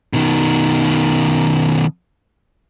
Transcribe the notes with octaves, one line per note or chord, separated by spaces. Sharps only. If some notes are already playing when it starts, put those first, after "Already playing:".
B2 D#3